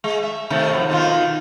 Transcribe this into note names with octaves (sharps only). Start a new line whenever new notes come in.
G#3
E5
C3 D#3 A3
F2 F#3
B2 D#3 F4